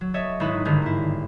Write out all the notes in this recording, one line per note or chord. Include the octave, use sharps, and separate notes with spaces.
F#3
A4 C#5 D#5 E5
G#1 D#4 E4 B4 B5
G#1 G2 D3 D#3 A#4 B4
A#3 E4